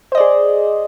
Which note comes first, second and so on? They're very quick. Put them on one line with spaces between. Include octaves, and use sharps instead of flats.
C5 D#5 D5 G#4